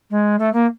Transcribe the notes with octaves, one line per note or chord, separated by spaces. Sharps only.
G#3
A3
A#3